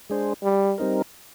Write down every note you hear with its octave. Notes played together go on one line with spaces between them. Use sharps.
G#3 D4 G#4 C5
G3
G3 C4 D#4 A#4